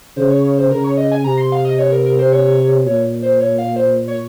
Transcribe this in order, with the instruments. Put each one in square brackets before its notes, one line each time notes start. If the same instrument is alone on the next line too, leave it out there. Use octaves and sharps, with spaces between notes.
[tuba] C#3 [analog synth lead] C5
[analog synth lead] C#5
C#5
C5
[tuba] C#3 [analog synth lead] A#4
[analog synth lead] C#5
D#5
G#5
[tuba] C3 [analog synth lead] A#5
[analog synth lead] C6
F5
D#5
C#5
A#4
A#4
C5
C#5
[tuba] A#2 [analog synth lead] C#5
[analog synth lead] C5
C#5
F5
C5
C#5